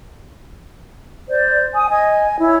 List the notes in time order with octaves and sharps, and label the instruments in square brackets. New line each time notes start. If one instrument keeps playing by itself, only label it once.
[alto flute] C5 [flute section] D5
[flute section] G#5 D#6
[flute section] D#5 [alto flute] G#5
[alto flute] E4 [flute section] C#5